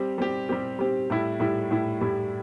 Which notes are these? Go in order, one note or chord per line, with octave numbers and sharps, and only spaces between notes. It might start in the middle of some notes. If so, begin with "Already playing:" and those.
Already playing: G3 C4 G4
G3 C4 G4
G3 C4 G4
G3 C4 G4
A2 G3 E4
A2 G3 E4
A2 G3 E4
A2 G3 E4